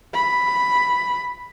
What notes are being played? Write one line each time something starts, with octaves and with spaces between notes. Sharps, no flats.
B5